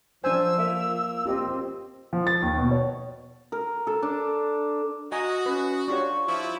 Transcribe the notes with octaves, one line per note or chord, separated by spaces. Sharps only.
F3 D4 C5 G#5 E6
A#3 E5
C4 F4 G4 D#5
F3
A6
D#2
B2
C#5
A#4
A4
D4
F#4 D#5 G#5 A#5 D#6
C#4 B4
D4 F4 G4 C#5 C#6
F3 E4